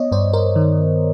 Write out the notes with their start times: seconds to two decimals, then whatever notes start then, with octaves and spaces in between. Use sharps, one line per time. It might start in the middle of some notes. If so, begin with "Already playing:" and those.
Already playing: B3 C#5 D#5
0.12 G2 C5 D5
0.33 A#4 C5
0.56 D#3